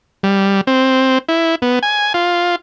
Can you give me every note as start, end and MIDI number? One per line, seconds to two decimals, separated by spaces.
0.23 0.61 55
0.67 1.18 60
1.29 1.55 64
1.62 1.79 59
1.83 2.13 80
2.14 2.56 65